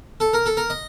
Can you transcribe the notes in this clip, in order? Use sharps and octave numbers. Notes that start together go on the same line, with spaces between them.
A4
A#4
A4
A#4
D#5